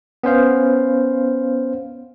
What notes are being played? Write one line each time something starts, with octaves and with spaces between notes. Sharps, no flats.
B3 C#4 C5 F5